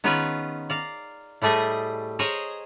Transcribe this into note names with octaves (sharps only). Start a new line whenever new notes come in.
D#3 B3 C#4 F4 G#4 B4
D5 F5 A#5
A2 G3 A3 G#4 D#5
G#4 A#4 C5 C#5 D#5